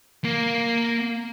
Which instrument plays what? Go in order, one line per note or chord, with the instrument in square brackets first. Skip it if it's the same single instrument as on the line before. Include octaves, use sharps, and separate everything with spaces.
[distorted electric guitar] A#3